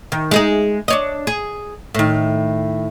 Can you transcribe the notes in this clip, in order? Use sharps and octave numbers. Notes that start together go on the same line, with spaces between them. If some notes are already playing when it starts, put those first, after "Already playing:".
D#3
G#3 D#4 G#4
D4 C#5 D#5
G#4
A2 D#3